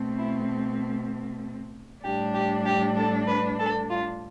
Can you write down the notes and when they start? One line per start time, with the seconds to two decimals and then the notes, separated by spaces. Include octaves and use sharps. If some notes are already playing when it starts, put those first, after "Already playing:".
Already playing: B2 A3 C4
0.18 E4
2.04 A2 G3 D4 G4
2.34 G4
2.66 G4
2.97 A4
3.27 B4
3.59 A4
3.89 F4